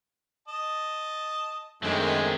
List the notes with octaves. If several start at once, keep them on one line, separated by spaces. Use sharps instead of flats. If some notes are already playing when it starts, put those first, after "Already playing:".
D#5 A5
F#2 D3 D#3 F#3 G#3 A3 C4